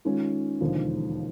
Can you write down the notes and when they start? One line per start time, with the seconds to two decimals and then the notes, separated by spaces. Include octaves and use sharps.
0.05 D#3 G#3 C#4 F4
0.61 E1 D#2 D3 F3